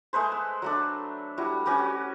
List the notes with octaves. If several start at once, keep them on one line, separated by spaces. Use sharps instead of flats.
G#3 A3 B4 C5
E6
F#3 A3 D4
G3 E4 F#4
C#4 F#4 G4 B4